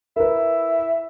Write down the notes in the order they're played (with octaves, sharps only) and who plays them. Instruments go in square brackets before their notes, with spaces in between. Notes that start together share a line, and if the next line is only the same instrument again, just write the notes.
[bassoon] E4 [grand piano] A#4 B4